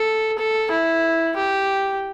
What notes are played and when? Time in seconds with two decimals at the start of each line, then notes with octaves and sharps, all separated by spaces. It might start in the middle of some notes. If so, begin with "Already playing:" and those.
Already playing: A4
0.38 A4
0.71 E4
1.36 G4